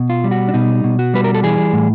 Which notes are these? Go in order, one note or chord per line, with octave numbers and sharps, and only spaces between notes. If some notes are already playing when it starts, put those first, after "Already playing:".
Already playing: B2
F4
G3
F#4
D4
B2 D#4
B2
F#4
G3 B4
A#4
A4
E3 G#4
A2